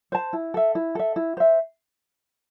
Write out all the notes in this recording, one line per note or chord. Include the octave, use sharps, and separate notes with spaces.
C5 A5
E4
A4 E5
E4
A4 E5
E4
C5 E5